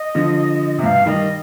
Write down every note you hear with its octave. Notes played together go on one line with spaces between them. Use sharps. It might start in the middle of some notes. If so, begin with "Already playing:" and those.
Already playing: D#5
D3 F3
C3
G2 B2 F5
D#3 G3 D#5